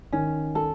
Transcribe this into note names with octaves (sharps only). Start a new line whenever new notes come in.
D#3 C#4
A4